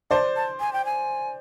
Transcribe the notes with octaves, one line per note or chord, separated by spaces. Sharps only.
C5 D5 A5
A5
G#5
G5
G#5